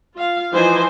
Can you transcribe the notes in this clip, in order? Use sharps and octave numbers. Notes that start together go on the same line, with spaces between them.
F4 F5
E3 F3 D#4 C5 G#5